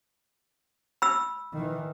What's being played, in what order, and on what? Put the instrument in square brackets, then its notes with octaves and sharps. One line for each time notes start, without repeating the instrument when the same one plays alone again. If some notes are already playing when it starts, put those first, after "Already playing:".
[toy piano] B5 E6
[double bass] D#3 E3